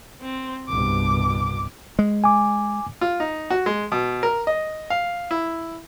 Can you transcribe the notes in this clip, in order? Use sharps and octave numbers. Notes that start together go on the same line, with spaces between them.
C4
C2 G2 B2 D6
G#3
G#5 D6
F4
D#4
F#4
G#3
B2
A#4
D#5
F5
E4